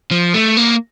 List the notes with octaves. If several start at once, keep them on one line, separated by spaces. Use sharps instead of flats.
F3
A3
A#3